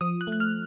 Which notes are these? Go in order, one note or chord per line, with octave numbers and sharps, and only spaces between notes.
F3 D#6
F#6
A3
F#6
F6